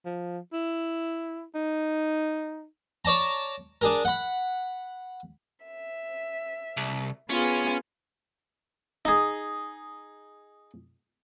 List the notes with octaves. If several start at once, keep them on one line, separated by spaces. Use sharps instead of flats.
F3
E4
D#4
C#5 D5 A5 A#5
D4 G#4 A#4
F#5 B5
E5
C2
B3 C#4 F4 G#4
D#4 G#4